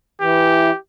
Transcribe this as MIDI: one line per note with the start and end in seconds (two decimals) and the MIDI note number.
0.21 0.71 52
0.21 0.78 67